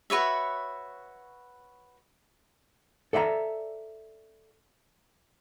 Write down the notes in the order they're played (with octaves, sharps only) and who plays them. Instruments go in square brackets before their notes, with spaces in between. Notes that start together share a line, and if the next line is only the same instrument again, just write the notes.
[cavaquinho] F#4 B4 C#5 E5
[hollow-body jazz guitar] A4 D5 E5 F5 A#5